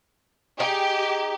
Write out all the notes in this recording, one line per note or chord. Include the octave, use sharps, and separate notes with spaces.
D#4 G4 G#4